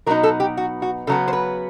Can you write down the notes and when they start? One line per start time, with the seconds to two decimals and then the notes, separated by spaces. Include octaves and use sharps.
0.06 B2 F#3 B3 D#4 A#4
0.23 A4
0.40 G4
0.57 F#4
0.82 F#4
1.07 C#3 F#3 B3 A4
1.28 C5
1.33 B4